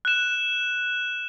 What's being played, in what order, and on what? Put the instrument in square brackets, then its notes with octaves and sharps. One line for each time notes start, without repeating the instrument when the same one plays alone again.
[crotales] F#6 E7